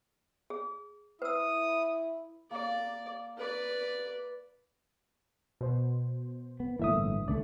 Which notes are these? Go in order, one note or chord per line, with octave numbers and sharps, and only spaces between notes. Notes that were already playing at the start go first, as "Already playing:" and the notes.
G#4
E4 B4 D#6 E6
A#3 D5
B4 D5
B2 C5
B3
G1 A2 E3 A#3 E5 D#6
C#2 D3 A3 D5